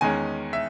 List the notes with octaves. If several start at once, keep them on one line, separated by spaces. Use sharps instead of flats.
E2 D#3 G#3 C#4 G#5
E5